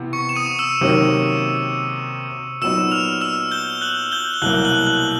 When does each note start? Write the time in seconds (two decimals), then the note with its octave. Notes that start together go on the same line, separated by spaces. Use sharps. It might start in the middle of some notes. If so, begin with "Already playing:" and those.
Already playing: C3 E3 B3
0.13 C#6 C#7
0.29 E7
0.36 D#6 D#7
0.59 E6 E7
0.81 C3 D#3 F#3 A#3 C#4
2.62 A#2 F#3 B3 D#4 E6 E7
2.91 F6 F7
3.21 E6 E7
3.52 G6 G7
3.82 F#6 F#7
4.12 G6 G7
4.34 G7
4.42 C2 B2 F#3 A#3 F#6 F#7
4.65 F#6 F#7
4.87 F#6 F#7